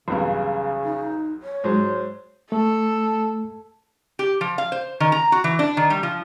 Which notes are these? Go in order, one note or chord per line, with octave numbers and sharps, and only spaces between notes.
B1 E2 G2 C#3 F5
D#4
C#5
G#2 F#3 G#3 C5
A3 A4
G4
F3
F5
C5
D#3
A#5
F#4
E3
D4
D#3
G3
F3